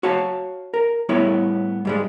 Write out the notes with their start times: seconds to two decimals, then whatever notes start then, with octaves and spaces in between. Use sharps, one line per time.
0.03 F#4 C#5 F5 A5
0.74 A#4
1.09 A2 G3 B3 E4 C#5 B5
1.85 G#2 G3 G#3